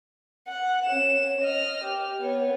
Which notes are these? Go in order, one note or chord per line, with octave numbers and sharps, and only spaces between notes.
F#5
C#4 E7
D#5 F6
G4
B3 C#5